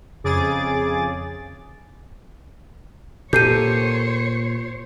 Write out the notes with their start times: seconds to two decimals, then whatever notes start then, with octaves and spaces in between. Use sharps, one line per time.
0.24 F2 C#3 G#4 D6 A6
3.33 A#2 G4 A4 C5 C#5 G6 C7 D#7